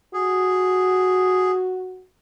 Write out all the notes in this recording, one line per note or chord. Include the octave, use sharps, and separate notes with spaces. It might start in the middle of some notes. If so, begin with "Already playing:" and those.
F#4 G#4